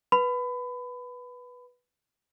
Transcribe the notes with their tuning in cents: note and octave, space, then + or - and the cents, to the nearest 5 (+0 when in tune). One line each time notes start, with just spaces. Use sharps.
B4 -10 B5 +25